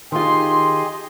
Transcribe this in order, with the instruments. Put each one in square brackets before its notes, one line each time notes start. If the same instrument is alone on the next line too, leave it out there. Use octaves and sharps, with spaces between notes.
[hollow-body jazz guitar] D#3 F4 [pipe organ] G4 G#4 D#5 [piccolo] C6